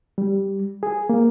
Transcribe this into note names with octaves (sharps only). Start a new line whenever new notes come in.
G3
G#4
A#3